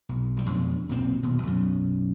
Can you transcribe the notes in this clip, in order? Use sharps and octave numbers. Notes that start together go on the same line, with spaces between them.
B1
B1 G3
F2 B2 D4
B1 A#2 C4
D#1 B2
B1 F#2